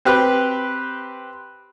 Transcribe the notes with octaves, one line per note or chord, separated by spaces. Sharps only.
C4 G4 B4 F#6